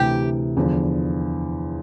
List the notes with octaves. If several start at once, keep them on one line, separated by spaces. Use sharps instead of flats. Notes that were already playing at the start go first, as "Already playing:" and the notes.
Already playing: D2 C3 E3 G4
E2 D3 F3